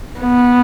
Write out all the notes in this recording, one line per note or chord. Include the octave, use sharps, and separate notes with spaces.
B3